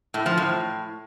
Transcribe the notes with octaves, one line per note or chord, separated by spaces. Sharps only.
A2
F3
A2